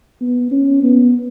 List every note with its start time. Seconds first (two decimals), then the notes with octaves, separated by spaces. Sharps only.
0.21 B3
0.52 C#4
0.83 B3